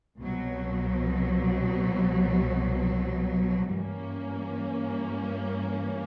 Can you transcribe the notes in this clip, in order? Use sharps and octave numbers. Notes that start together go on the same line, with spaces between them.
C2 B2 F#3
G2 E3 G3 A#3 C#4